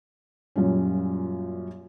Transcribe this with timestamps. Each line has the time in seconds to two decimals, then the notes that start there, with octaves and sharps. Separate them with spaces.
0.56 F#2 A#2 G3 C#4